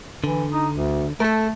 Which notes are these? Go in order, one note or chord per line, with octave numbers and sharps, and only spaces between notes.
D3 E3
D#4
D2
A3 A4 A#4